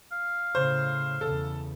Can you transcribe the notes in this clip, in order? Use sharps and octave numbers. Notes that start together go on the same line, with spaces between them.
F5
A2 C#3 C5
E2 C#3 A4